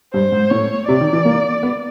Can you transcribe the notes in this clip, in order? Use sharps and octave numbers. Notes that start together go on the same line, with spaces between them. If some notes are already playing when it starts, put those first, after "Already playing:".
G2 C5
G#2
A2 C#5
C3 D5
D#3
E3
A#3
B3